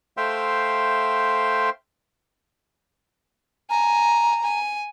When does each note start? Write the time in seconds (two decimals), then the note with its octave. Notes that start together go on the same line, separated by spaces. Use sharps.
0.17 A3 C5 E5 F5 G5 C6
3.70 G#5 A#5
4.44 G#5